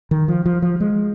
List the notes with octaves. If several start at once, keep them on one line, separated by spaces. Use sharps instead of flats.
D#3
F3
F3
F3
G#3